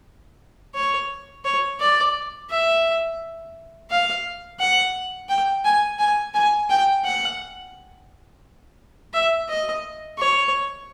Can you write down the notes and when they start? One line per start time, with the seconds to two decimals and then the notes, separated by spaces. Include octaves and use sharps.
0.74 C#5
1.45 C#5
1.80 D5
2.50 E5
3.90 F5
4.60 F#5
5.29 G5
5.65 G#5
5.99 G#5
6.34 G#5
6.69 G5
7.05 F#5
9.13 E5
9.49 D#5
10.18 C#5